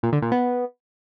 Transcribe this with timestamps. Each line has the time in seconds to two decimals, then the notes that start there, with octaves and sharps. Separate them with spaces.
0.03 A#2
0.13 D3
0.22 A#2
0.32 B3